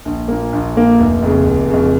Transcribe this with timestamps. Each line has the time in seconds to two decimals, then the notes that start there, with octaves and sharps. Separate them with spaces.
0.05 A#1
0.28 A#2 A#3
0.53 A#1
0.76 A#2 A#3
1.00 F1
1.22 F2 C#3
1.46 F1
1.70 F2 C#3